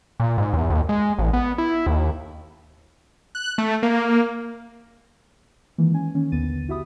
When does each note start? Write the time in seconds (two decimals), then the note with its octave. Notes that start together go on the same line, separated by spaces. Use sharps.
0.20 A#2
0.38 G#2
0.53 E2
0.70 D#2
0.89 G#3
1.19 A1
1.33 B3
1.58 E4
1.86 D#2
3.35 F#6
3.58 A3
3.83 A#3
5.78 D#3 E3 G#3 A#3
5.93 E3 C#4 G#5
6.14 D#3 A#3 C#4
6.32 A#1 D#2 D3 B3 A6 D#7
6.68 E4 F#4 G4 E5 B5 D#6